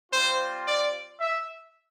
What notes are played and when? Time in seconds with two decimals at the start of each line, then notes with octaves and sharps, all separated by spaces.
0.12 G3 C4 F4 C5
0.66 D5
1.20 E5